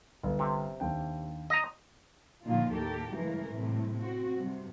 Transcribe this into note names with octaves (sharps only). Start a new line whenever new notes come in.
G1
C3
D#2 D4 G5
D#5 A#5
A#2 D3 D#3 F3 A#3 F4
D#2 A2 G4 A4 A#4
G2 C#3 E3 G#3 A3 A#4
A2 C3 G3
C4 F#4
G2 C3